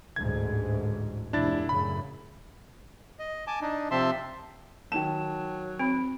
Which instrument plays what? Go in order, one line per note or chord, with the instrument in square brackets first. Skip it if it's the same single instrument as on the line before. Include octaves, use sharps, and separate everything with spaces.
[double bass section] A1 D2 G#2 [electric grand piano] G#6
[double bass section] F1 [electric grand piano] D4 E4 A6
[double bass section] F#2 A2 C#3 [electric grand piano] B5
[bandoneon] D#5
G#5 A5 D6
D4 D#4
C3 F3 C4 E5 A5 C6
[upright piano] D#3 E7 [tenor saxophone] F#3 [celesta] G5 A5
[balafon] C4 [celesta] B5 D7